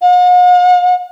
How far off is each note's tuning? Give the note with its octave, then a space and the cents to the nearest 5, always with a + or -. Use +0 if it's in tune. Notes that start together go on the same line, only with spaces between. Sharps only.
F#5 -45